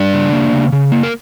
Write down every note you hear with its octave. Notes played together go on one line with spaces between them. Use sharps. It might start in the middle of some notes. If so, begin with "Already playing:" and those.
Already playing: G3 D4 D5
C#3
A#3
C#3
C#3
A#3
A#4